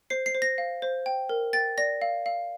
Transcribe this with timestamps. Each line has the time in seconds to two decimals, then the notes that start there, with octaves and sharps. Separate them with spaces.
0.10 C5 C7
0.26 C7
0.35 C5
0.42 A#6
0.58 F5
0.82 C5
1.06 G5
1.29 A#4
1.53 G5 A6
1.78 D5 A#6
2.02 F5
2.26 F5